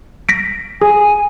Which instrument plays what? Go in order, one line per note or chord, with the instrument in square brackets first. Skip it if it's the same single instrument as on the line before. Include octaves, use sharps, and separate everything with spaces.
[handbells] A#6 B6 D7
[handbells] G#4 [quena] G#5